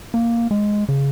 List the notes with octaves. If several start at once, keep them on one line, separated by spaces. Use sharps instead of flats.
A#3
G#3
C#3